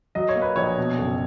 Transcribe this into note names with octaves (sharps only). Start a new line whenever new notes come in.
F#3 D#5
C#5
A#3
B4
A#1 C#5
B2
F#1